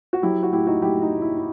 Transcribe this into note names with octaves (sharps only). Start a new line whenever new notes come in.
F#4
F#3 E4 G4
F#4
A2 E4 G4
D#4 F#4
F#3 E4 G4
D#4
A2
E4
E4